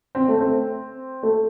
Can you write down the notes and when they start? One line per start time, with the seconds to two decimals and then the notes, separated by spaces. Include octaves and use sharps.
0.15 C4
0.28 A3
0.41 C4
1.23 A3